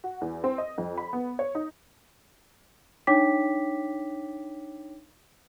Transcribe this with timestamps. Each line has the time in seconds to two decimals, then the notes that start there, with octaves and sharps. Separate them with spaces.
0.04 F#4
0.21 E2
0.44 C4
0.58 D#5
0.78 F2
0.98 B5
1.13 B3
1.39 C#5
1.55 D#4
3.07 D4 D#4 C#5 G5 D6 B6